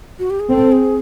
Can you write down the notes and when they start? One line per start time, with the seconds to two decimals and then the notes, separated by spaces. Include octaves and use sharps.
0.19 F#4
0.30 G4
0.40 G#4
0.50 C4 A4
0.72 G#4